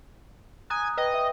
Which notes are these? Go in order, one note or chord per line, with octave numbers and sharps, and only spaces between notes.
G#5 A#5 D#6 F#6
B4 D#5 G5
E5 G5